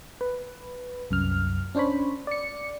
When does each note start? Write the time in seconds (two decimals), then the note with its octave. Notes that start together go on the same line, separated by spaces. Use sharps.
0.21 B4
1.10 C2 F#2 F6
1.75 C#4 D4 C5 C#5 B5
2.27 D5 C#7